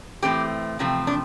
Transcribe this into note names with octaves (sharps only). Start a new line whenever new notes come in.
A2 E3 A3 C4 G4
E2 C3 F3 A3 C4
D4